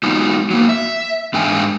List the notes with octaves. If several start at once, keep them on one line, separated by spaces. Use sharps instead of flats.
F#3 G#3 B3 D#4 F4 F#4
F#3 A#3
E5
G#2 G#3 D4 F5 G5 G#5